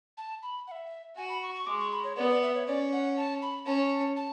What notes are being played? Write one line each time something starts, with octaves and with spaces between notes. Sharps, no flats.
A5
B5
F#5
E5
F#4 G#5
B5
C#6
C#6
G#3 D6
C#6
B5
C#5
B3 D5
D5
E5
C#5
C#4 D5
F#5
A5
B5
C#4 A5
A5